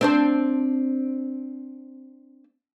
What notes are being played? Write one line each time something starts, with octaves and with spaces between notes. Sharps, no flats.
C4 D4 C5